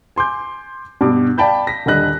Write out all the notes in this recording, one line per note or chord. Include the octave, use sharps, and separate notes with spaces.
G#5 C6 D6 G6
G2 B2 D6
D5 F5 G5 A5 B5 G6
A#6 B6
D#1 D3 G3 D#5 F#6 A#6